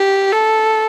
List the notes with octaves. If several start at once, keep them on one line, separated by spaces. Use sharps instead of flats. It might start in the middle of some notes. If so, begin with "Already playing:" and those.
Already playing: G4
A4